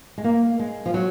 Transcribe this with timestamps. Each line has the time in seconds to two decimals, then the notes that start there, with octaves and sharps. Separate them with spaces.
0.18 G#3
0.24 A#3
0.59 G#3
0.86 F3
0.94 F#3